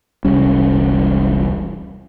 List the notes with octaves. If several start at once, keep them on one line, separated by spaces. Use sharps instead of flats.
E1 C2 G3 C#4